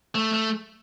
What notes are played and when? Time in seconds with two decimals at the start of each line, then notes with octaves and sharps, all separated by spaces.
0.15 A3
0.33 A3